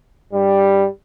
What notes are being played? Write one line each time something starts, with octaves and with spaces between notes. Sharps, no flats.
G2 G3